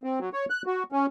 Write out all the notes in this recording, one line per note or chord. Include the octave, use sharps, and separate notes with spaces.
C4
F#3
C#5
F#6
F#4
C#4